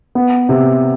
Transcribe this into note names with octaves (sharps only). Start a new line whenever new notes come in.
B3
C3